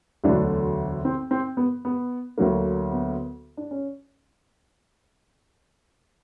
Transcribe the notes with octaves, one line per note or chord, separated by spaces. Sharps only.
E1 D2 D3 F#3 A3 D4
C4
C4
B3
B3
D2 D3 F#3 A#3
B3
D4
C#4